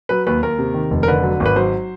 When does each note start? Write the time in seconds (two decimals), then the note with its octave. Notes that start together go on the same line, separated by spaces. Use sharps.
0.09 F#3 B4
0.27 D#2 B4
0.43 D#2 A#4
0.59 C3
0.74 D#3
0.91 F1
1.03 A#4
1.08 D3 B4
1.23 F#3
1.40 G#1
1.46 B4
1.56 F#3 C5